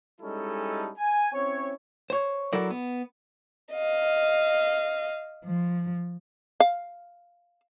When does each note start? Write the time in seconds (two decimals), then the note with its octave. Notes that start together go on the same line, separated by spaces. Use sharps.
0.21 G3 G#3 C#4 D#4 E4 A4
0.98 G#5
1.33 C4 C#4 E4 C#5
2.10 C5 C#5
2.53 F#3 E4 A4 A#4 D5
2.70 B3
3.75 D#5 F5
5.46 F3
6.60 F5